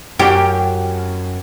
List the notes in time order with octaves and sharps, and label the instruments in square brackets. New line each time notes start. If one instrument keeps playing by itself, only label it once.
[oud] F#2 G4